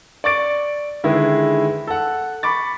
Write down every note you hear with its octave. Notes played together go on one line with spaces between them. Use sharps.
D5 C#6 D6 A6 D7
D3 D#3 G#3 E4 G#4 B4
A4 F#5
B5 C#6 D6 A6